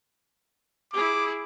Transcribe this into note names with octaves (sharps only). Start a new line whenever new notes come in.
E4 G#4 D6